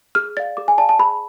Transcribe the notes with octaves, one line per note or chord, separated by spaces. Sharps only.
G#4 F6
D5 F5 A6
G#4 D6
G#5
D5 F5 A5
A5
G#4 B5